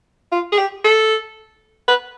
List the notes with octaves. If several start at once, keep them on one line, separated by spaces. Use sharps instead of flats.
F4
G#4
G4
A4
B4